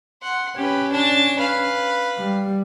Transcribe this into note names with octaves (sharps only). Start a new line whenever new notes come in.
F#5 C6
C#4 G4 B4
D4 A5
B4 F5
G3